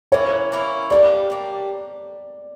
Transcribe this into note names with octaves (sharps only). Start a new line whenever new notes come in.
E3 A#3 C#4 E4 C#5
E3 A#3 C#4 E4
G3 A#3 D4 D5
G3 A#3 D4